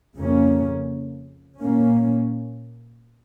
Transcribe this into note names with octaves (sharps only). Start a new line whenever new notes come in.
F2 C#3 A#3 C#4
A#2 A#3 C#4